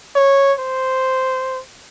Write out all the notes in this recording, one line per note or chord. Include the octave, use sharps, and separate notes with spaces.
C#5
C5